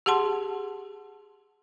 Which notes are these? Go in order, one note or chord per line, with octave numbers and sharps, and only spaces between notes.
G4 G#4 F#5 A5 C6